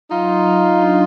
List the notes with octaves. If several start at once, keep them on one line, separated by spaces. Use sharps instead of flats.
F#3 D#4 F4
F#3
D4